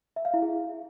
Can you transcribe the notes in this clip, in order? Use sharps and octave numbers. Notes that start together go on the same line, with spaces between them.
E5
F5
E4
G#4